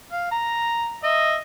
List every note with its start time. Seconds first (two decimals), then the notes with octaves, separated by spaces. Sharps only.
0.12 F5
0.31 A#5
1.03 D#5 E5